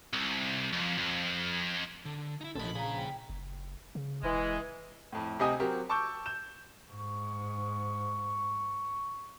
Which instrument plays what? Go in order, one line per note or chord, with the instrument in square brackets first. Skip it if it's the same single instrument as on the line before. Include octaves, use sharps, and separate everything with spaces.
[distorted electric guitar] C2
F2
F2
[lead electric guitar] D3
D#4 E4
[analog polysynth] A#1 B5 [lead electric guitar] A4 D#5
[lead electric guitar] C#3 G#4 [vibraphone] F5 A#5
[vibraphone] G5
[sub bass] F#1
C#3
[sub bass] E1 [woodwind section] E3 G#3
[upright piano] F2 A2
D2 C3 G4 D#5 G#5 D#6
F#3 C4 F#4 G4 A#4
A5 C#6 D6 E6 G6
G6 E7
[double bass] G#2 [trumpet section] C#6